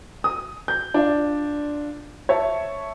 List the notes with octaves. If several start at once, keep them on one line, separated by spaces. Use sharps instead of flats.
D#6
G6
D4 F4 D5
C#5 E5 A5